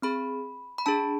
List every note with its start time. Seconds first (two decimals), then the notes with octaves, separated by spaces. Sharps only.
0.02 C4 G#4 B5
0.78 B5
0.86 D4 G#4 A5